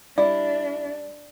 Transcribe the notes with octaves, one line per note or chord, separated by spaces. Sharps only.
G3 D4 E4 D5